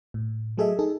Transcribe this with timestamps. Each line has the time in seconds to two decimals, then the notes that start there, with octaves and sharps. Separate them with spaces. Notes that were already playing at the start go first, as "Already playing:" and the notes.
0.14 A2
0.58 F#3 A3 G#4 A4 D#5 E5
0.79 D#4 G#4 A4